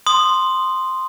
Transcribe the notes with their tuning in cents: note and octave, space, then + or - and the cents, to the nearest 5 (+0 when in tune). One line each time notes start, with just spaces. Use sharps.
C6 +0 D#6 -15